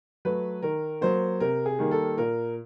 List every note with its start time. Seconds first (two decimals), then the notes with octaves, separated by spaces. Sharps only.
0.25 F#3 A3 B4
0.62 D#3 A#4
1.01 F#3 A#3 C5
1.40 C3 A#4
1.66 G#4
1.79 D#3 G3 A#3
1.91 A4
2.18 A#2 A#4